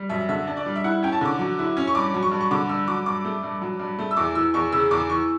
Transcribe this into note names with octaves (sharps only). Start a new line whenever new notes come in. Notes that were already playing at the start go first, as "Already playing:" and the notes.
Already playing: G3
F#2 E5
D3 E5
D4
D5
G3
E5
E4 F#5
C#4 G5
A5
D3 D6
F#3
E4
C#4
C#6
G2 D6
F#3
C#6
G2
C#6
D3 D6
G2 E6
F#3 D6
G2 D6
A3
G2
F#3
G2
A3
E6
E2 D6
E3 E6
E2 C#6
C#3 E6
E2 D6
E3 C#6